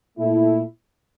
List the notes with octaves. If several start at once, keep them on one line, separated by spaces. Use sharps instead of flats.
A#2 A3 E4 A4